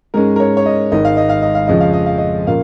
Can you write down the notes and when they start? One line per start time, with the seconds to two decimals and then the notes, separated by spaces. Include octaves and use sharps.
0.14 G#2 G#3 C#4 A#4
0.36 A#4
0.40 C#5
0.57 C#5
0.66 D#5
0.92 G#1 G#2 D#3 D#5
1.05 F5
1.17 D#5
1.29 F5
1.42 D#5
1.55 F5
1.68 F2 C#3 F3 G#3 C#4 D#5
1.80 F5
1.93 D#5
2.06 F5
2.18 D#5
2.47 A#2 A#3 C#4 F5